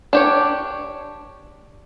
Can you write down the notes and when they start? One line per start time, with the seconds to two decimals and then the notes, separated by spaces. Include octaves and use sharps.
0.13 D4 G4 C#5